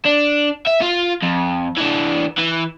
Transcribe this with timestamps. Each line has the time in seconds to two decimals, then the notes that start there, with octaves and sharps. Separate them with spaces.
0.05 D4
0.67 E5
0.81 F4
1.22 F2
1.78 E3 D4
2.38 E3